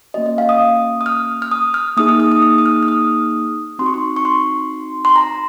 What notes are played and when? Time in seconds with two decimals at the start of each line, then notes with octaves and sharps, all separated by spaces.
0.14 A#3 C#4 F#4 D#5
0.26 D#5
0.38 F5
0.49 D#6
1.01 D#6
1.06 F6
1.42 F6
1.51 D#6
1.74 F6
1.97 A#3 D#4 G#4 D#6
2.09 F6
2.20 D#6
2.32 D#6
2.42 D#6
2.58 D#6
2.66 F6
2.83 F6
2.88 D#6
3.79 C4 D#4 F#4 C6
3.86 C#6
3.94 C6
4.16 C#6
4.25 C6
5.05 C6
5.16 A#5